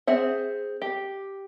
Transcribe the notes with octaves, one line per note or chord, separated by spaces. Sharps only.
C4 G#4 E5 F#5
G4